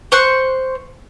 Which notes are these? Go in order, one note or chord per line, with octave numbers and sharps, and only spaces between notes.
C5 C6 C#6 F#6